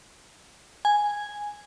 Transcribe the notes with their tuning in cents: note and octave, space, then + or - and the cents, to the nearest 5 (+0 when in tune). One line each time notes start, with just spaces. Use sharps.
G#5 -5